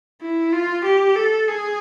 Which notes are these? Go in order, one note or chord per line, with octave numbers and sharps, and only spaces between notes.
E4
F4
G4
A4
G#4